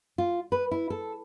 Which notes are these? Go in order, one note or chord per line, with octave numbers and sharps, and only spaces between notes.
F4
B4
E4
A4